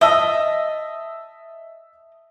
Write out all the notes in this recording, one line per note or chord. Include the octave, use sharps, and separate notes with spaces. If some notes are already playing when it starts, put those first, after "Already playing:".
D#5 E5 A5 E6